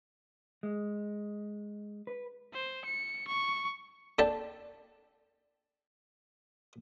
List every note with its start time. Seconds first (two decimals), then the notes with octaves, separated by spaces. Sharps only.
0.63 G#3
2.07 B4
2.53 C5
2.85 C#7
3.28 C#6
4.19 D4 A4 G5 A5